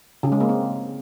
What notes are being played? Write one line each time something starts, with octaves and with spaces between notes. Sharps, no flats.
C#3
G#3
A#3
C4